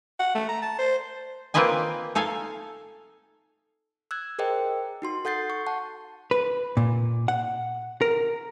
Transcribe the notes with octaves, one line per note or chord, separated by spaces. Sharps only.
F#5
A3
A#5
A5
C5
A#3 C4 F4 B4 D#5 G#5
D#4 A4 F5 G#5
E6 F#6 G#6
G#4 A#4 C5 D#5 G5
D#4 F#4 C6
A4 F#5 G6 A6 C7
C#6
F#5 A5
B4
A#2
F#5
A#4